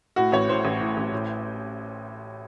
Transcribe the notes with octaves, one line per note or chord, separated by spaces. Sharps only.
A2 F#4
A1 C#5
A2 C5
A1
A2
A1
A2